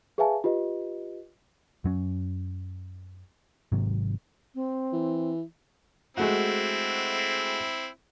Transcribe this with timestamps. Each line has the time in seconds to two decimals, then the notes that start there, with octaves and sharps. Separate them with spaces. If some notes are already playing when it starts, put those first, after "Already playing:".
0.18 G#4 B4 E5 F5 G#5 A5
0.44 F4 G4 B4 D#5
1.84 F#2 F#3 C#4
3.72 G#1 G#2 C3 F#3
4.55 C4
4.93 E3
6.17 G#3 A3 C4 E4 F#4